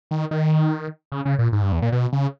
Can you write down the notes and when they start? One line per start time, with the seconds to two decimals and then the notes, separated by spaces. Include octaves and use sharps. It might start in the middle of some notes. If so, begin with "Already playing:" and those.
0.11 D#3
0.31 D#3
1.12 C#3
1.25 C#3
1.39 A#2
1.52 G#2
1.62 G2
1.72 E2
1.82 A#2
1.92 B2
2.13 C#3